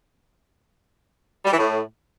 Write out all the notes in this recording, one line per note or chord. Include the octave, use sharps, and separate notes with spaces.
G3
E3
A2